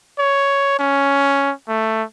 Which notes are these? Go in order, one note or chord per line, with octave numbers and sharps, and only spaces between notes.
C#5
C#4
A3